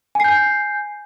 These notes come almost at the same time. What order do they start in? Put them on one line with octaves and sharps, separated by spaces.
G#5 C7 G6